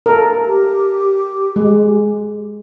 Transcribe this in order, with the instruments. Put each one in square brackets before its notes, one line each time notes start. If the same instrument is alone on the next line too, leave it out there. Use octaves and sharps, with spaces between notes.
[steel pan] A4 A#4
[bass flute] G4
[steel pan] G#3